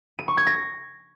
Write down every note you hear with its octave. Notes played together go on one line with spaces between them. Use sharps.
D#7
C#6
G#6
A#6